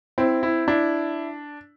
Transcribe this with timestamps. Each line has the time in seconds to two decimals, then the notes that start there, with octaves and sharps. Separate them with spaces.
0.18 C4 E4
0.43 E4
0.68 D4 E4